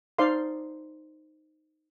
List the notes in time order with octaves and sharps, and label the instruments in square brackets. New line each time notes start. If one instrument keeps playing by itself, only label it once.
[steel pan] D#4 C5 D5 F5 C6